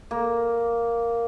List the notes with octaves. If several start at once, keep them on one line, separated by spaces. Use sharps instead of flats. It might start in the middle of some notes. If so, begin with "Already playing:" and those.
A#3